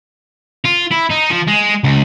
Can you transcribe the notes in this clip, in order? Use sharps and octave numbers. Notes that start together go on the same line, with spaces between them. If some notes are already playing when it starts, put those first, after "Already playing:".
F4
E4
D#4
F3
G#3
C#2